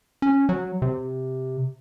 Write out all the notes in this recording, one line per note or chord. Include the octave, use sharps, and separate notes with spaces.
C#4
F#3
C3